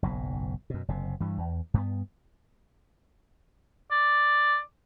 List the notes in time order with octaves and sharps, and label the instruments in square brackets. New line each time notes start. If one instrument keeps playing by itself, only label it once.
[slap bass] F#1 B1 G#2
F#2 B2
F#1 C3
G2 E3 G3
E2
G2 A#3 B3
[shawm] D5